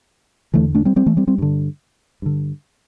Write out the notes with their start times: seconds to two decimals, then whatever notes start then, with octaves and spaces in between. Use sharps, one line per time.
0.54 E2 D3 E3 A3
0.75 A3 D4
0.85 G3 C4
0.96 G3 C4
1.06 E3 A3
1.17 G3 C4
1.27 G3 C4
1.38 G2 D3
2.22 G2 D3